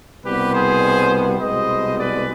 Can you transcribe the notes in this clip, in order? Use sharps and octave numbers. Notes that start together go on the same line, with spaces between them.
C2 B2 G3 B3 G4 B4
G#4 C5
C2 B2 G#3 B3 C5 D#5
B4 D5